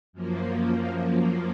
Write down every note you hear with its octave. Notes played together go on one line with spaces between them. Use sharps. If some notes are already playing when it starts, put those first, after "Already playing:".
F#2 F3 A#3